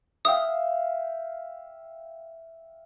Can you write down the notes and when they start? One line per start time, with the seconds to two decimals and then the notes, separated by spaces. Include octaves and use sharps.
0.25 E5 F5 G5 D#6